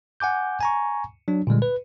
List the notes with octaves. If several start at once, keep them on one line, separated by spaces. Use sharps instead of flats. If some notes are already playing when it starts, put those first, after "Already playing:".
F#5 G#5 D6 G6
G#5 A#5 C#6
F#3 D4
A#2 D3 G3 G#3
B4